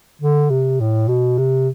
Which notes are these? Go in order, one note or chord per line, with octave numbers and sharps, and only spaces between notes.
D3
C3
A2
B2
C3